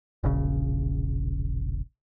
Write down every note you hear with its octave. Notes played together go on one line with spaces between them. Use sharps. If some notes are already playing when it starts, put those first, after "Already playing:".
E1 A#1 C#3